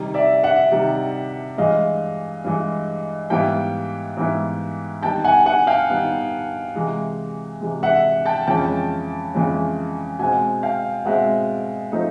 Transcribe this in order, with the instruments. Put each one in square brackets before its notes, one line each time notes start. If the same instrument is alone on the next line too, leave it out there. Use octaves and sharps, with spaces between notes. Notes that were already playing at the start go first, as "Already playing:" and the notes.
Already playing: [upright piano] C3 D#3 G3
[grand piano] D5 E5
E5 F#5
[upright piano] C3 D#3 G3
[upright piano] G2 E3 G#3 [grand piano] D#5 F5
[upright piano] G2 E3 G#3
[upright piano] G#2 E3 G3 B3 E4 [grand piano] F5 G5
[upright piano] G#2 E3 G3 B3 E4
[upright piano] D#3 G3 B3 [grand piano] G5 A5
[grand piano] F#5 G#5
F#5 G#5
F5 G5
[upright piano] D#3 G3 B3
C3 E3 G#3
C3 E3 G#3
[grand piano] E5 F#5
G5 A5
[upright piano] F2 C#3 E3 G#3 C#4 [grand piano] G5 A5
[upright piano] F2 C#3 E3 G#3 C#4
[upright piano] B2 G#3 C4 [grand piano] F#5 G#5
[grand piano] F5 G5
[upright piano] B2 G#3 C4 [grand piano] E5 F#5
[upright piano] F3 A3 C4 D#4